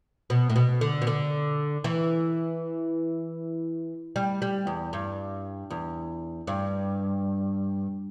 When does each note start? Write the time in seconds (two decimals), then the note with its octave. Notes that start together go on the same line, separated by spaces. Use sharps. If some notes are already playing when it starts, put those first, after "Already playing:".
0.30 B2
0.50 A2
0.56 B2
0.81 D3
1.02 B2
1.07 D3
1.84 E3
4.16 G3
4.42 G3
4.67 E2
4.93 G2
5.70 E2
6.47 G2